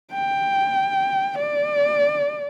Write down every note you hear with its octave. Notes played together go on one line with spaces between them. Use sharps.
G5
D5